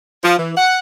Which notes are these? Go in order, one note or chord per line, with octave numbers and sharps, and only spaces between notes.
F3
E3
F#5